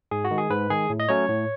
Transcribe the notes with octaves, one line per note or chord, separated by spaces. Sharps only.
G#2 G#4
F#4
D#3 G#3
G#4
G#2 B4
D#3 G#3 G#4
A2
D#5
F#3 A3 C#4 C#5
A2